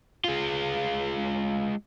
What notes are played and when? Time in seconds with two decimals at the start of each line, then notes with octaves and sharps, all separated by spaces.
0.24 G#3 F4